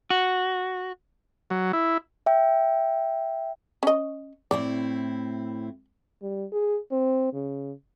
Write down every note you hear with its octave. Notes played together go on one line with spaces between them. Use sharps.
F#4
F#3
E4
E5 G5
C#4 D#5
A2 C4 E4 D5
G3
G#4
C4
C#3